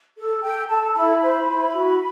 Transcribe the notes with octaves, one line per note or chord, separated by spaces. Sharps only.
A4
A4 G5
A4 A5
E4 B5
C5
E4
F#4